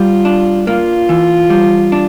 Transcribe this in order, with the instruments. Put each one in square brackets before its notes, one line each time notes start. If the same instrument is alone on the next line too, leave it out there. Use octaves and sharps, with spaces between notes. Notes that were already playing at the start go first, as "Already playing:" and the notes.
Already playing: [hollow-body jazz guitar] G3 [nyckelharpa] F4
[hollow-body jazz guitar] D4
[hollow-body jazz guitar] A#3 [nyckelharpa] F4
[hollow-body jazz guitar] E3
G3
D4